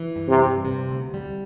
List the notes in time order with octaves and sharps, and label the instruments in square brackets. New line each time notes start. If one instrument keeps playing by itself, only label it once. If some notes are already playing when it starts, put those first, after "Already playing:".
Already playing: [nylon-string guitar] E3
G2
[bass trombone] C3
[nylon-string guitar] G2
C3
D2
G3